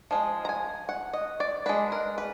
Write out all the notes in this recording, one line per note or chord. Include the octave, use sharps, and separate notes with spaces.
F3 G#3
A#5
G#5
F#5
D#5
D5
G#3 D4 B4
A#4
B4